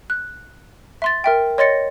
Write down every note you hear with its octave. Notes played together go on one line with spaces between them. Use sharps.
F#6
E5 C6 A6
A#4 E5 G5
C#5 D#5 C6 A6 A#6 C#7